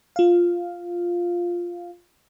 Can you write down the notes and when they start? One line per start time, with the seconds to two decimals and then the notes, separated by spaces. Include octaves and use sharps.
0.16 F4 F5